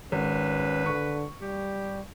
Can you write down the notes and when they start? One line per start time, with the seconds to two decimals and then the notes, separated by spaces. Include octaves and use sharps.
0.12 G#1 C#4 B4
0.86 D3 C#6
1.42 G3 G4